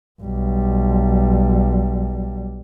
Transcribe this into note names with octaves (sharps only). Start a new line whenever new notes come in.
B1 G3